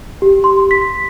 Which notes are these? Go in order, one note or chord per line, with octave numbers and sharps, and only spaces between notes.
G4
C6
B6